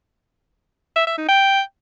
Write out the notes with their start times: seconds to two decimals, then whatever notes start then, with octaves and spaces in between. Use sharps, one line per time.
0.96 E5
1.07 E5
1.18 D#4
1.29 G5